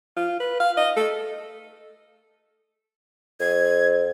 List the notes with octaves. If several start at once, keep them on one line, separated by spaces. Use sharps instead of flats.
F4
B4
F5
D#5
A4
F2 G#6